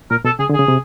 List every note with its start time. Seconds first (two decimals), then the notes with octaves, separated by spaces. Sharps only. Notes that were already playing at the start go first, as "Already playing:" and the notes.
0.11 A#2 A#4
0.24 B2 A4
0.39 C#3 G#4
0.49 D3
0.54 G#4
0.59 C#3
0.68 C3